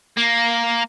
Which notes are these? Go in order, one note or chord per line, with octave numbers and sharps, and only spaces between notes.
A#3